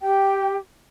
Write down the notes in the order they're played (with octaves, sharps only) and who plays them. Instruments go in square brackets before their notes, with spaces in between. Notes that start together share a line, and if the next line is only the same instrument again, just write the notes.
[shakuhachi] G4 [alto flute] G5